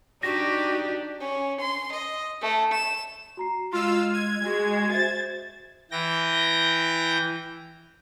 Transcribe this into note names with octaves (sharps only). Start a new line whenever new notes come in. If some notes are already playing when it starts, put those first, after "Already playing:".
D4 D#4 F#4 G4 A#6
C#4
C6
D#5
A3
E7
F#4 A#5 C7
G#3 F4 F5 C6 E6
F6 G#6 D#7
G#3 F#4
F#4 C5 E5 A6
E3 G5 A#6